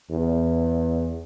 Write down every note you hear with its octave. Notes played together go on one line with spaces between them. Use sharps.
E2